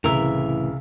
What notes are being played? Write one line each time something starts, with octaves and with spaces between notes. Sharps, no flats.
C2 A2 C#3 E3 A#4 E5